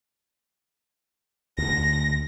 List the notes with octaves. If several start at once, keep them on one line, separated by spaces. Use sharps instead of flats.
D2 A#6